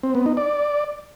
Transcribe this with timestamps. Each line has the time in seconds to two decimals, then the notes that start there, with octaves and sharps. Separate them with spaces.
0.03 C4
0.15 B3
0.26 D#4
0.37 D5